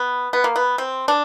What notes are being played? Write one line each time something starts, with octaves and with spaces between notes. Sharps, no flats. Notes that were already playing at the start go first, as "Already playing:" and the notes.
Already playing: B3
B3
A#3
B3
C4
D4